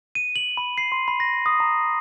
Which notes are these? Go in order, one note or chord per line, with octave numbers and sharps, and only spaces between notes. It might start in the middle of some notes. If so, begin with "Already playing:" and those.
D#7
F#7
B5
C7
C6
B5
A#6
D#6
A#5